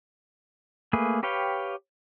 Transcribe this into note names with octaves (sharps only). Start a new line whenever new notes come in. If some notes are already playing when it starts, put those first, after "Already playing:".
A3 A#3 G#4 B4
G4 B4 C#5 F5 G5